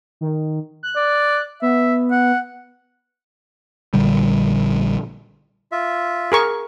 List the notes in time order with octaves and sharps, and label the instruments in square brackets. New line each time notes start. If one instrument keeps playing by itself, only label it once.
[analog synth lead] D#3
F#6
[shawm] D5
[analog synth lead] B3 [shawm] E5
[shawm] F#5
[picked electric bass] A#1 A#2 D3 G3
[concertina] F4 E5
[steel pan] G#4 A#4 C#6